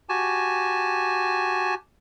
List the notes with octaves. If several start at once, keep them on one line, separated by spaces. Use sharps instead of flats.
F#4 G4 G#5 A5